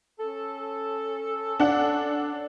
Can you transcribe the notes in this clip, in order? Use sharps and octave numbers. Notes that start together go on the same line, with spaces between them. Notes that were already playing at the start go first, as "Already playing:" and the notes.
C#4 A4
D4 F#5